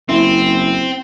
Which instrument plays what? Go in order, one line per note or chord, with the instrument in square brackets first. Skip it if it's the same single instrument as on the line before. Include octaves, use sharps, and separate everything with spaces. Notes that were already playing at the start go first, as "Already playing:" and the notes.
[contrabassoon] F#1 [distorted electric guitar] C4 [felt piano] E4